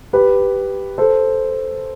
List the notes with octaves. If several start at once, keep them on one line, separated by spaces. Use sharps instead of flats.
G4 B4
A4 C5